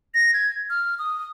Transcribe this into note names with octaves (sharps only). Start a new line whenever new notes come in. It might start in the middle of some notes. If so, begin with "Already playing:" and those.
A#6
G#6
F6
D#6